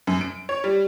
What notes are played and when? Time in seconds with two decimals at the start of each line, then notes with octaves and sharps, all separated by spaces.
0.07 F#2
0.21 D7
0.49 C#5
0.64 G3